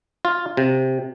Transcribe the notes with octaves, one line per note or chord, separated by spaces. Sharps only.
F4
C3